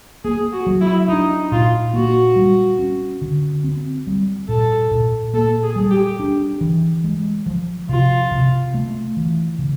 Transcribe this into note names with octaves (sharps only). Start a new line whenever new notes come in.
A#3 G#4
F#4
F#3
E4
D4 D#4
A#2 F4
A#3 F#4
G3
C#4
D3
C4
G3
A#2 A4
A#2
A#3 A4
G#4
G3
G4
D4
E3
G#3
F3
C3 F4
C3
A3
E3
C#3